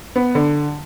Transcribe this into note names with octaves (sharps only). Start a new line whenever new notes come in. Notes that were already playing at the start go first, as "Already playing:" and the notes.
B3
D3